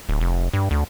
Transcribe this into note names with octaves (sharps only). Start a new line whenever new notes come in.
D1
F1
G2
D2